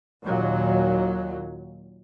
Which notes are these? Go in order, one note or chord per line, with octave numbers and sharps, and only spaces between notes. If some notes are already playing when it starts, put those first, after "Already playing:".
D#2 A#2 F#3